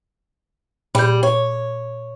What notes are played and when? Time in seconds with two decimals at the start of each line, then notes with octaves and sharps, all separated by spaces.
0.95 A#2 G3 G6
1.23 C#5